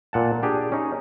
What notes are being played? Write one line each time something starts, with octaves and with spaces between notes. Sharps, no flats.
A#2 F#5 A5
D4 G4 G#4
C#4 D#4